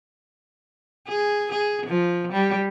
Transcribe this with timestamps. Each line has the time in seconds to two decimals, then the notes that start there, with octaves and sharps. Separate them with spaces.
1.09 G#4
1.52 G#4
1.86 F3
2.33 G3